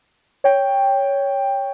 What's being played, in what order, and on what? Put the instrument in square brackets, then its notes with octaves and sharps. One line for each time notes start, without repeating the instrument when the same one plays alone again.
[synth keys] C#5 G5